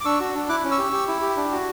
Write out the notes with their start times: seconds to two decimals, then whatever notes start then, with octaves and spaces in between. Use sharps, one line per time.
0.01 D6
0.05 D4 C#6 E6
0.20 F#4
0.35 D4
0.49 E4 D6 F#6
0.64 C#4
0.71 C#6 E6
0.79 G4
0.92 G4
1.08 E4
1.22 G4
1.37 D4
1.52 F#4